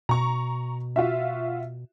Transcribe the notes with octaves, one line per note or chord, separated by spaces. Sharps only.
B2 A#5 C#6
F4 F#4 E5